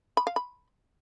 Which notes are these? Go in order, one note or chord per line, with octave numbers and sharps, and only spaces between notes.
B5
F5
B5